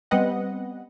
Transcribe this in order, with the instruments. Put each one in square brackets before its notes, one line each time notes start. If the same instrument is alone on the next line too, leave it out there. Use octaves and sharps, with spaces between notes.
[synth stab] G3 B3 C4 B4 D#5 F#5